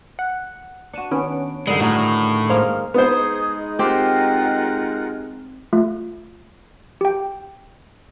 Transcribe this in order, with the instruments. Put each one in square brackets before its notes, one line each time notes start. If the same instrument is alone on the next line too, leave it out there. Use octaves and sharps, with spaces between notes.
[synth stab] F#5
[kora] D4 F#4 [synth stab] C#7 D#7 E7
[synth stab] D#3 C#4 D7 [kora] B3
[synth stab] G2 [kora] D3 D#3 G3 [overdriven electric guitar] G#3
[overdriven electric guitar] A2 [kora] F#4 G#4 A#4
[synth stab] F#2 C5 F6 [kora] G#3 A#3 G#4
[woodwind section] G#3 D#4 [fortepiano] B3 C5 [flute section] G#4 D#6
[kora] C4 G4 [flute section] F4 A#4 F#5
[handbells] A3 F4
G4 G5